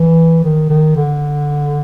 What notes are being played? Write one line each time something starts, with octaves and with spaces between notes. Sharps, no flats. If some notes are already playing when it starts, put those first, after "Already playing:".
Already playing: E3
D#3
D#3
D3